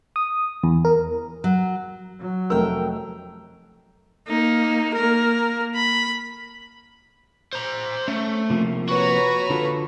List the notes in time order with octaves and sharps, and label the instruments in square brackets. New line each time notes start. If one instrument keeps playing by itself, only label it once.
[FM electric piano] D#6
E2
A#4
[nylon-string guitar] F#3
[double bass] F#3
[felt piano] F1 A3 E6 [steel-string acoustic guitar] A#4 G5
[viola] A#3 D#4
A#3 A#4
B5
[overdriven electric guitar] C5 A#5
[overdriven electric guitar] A3 [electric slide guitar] C#4
[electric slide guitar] C3 F3 A#3
[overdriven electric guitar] F#4 [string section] B4 C#5 A#5
[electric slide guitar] D3 F4 A4